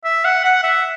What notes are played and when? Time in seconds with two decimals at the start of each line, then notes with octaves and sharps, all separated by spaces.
0.04 E5
0.25 F#5
0.44 F#5
0.63 E5